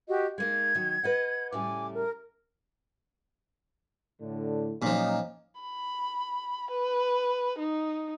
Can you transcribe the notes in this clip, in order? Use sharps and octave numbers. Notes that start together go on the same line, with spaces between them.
F#4 G4 D#5
G#3 A#3 D#4 G#6
D#3 F#3
B4 D#5 F#5
A2 C#3 G3 G#5 D6
A#4
A2 D3
A#2 F3 F#3 C#4 D#4
B5
B4
D#4